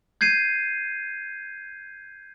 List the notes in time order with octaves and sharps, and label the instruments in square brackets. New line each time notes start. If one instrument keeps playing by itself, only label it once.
[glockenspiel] G6 G#6 C7 D#7